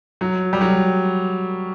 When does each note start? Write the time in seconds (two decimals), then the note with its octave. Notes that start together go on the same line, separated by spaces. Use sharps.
0.21 F#3
0.53 G3
0.61 F#3